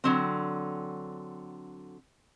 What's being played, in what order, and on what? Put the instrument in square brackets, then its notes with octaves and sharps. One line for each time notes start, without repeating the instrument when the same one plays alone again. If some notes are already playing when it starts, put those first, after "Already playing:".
[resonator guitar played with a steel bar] D3 F#3 C4